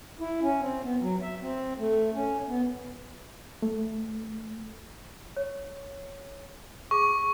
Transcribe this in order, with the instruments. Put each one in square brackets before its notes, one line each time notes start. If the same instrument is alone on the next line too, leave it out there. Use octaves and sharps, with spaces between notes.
[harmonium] E4
C#4
C4
B3
F#3
E5
C4
A3
C#4
B3
[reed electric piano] A3
[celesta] C#5
[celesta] G#4 D6 [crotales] C#6